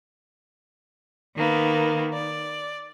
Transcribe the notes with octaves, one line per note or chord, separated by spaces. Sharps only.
D#3 A#3 B3
D5